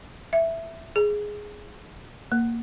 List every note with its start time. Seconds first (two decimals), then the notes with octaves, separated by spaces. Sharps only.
0.33 E5
0.96 G#4
2.32 A#3